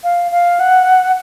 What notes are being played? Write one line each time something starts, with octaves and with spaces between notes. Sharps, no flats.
F5
F5
F#5